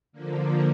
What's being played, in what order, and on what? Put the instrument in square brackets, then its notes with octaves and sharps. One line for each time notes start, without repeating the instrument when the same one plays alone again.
[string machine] D3 F3 A#3